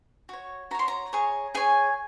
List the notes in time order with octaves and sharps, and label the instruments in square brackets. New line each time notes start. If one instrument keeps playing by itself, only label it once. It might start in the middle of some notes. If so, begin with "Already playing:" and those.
[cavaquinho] F#4 C#5
F#4 A#5
C#5 C6
A#5
G#4 C#5
G#4 C#5 G#5